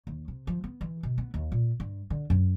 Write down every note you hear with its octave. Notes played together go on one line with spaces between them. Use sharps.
D#2
C3
F3
B3
E3
B2
B3
D#2
A#2
G2
D3
F#2